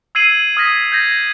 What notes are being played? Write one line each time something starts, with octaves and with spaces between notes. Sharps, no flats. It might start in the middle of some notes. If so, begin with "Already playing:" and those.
E6 G#6 C7 D#7 F#7
D#6 F6 G#6 A#6 B6
G6 G#6 A#6